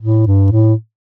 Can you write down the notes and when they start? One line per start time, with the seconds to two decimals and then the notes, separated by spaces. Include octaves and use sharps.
0.01 A2
0.27 G2
0.51 A2